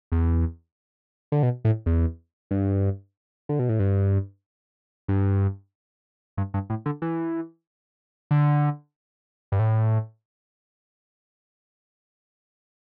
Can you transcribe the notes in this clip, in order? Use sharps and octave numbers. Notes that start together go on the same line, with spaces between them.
E2
D3
B2
A2
E2
G2
D3
B2
A2
G2
G2
G2
G2
A2
D3
E3
D3
G2
A2